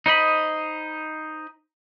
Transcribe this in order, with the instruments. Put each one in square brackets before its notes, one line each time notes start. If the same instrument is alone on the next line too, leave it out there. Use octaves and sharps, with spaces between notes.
[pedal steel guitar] D#4 C5 D#5 B5